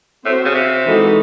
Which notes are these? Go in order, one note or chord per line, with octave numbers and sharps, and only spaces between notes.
A2 C4 F#4 C5
C#3
C3
E3 G#3 D#4 F#4 A4